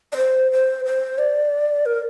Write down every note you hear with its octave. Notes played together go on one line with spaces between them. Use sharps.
D5
C5
C5
C5
D5
A#4